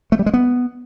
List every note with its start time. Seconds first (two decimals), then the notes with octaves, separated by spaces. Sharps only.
0.12 A3
0.19 G3
0.26 G#3
0.34 B3